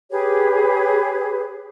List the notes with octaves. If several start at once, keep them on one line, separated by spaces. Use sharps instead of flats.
G4 G#4 B4 C#5